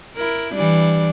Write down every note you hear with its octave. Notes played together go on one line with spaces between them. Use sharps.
E4 A#4
E3 G3 D4